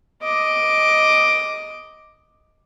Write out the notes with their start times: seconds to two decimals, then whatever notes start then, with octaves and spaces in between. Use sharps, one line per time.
0.23 D#5 D6